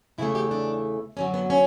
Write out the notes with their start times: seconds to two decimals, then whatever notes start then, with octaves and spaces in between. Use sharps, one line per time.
0.18 E2 C#3 E3 A3 E4
0.35 G4
0.51 D4
1.17 F#2 D3 F#3 C#4
1.34 B3
1.50 C#4